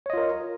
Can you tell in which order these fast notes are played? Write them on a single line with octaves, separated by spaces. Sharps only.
C#5 D#5 F4 A#4